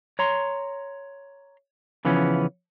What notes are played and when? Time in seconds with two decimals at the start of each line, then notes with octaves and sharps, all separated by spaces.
0.19 C#5 A#5 C6
2.05 C#3 E3 F3 B3 C#4